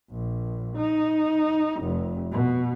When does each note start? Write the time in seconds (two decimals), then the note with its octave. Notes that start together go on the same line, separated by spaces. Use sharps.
0.10 A#1
0.77 D#4
1.82 F1
2.32 B2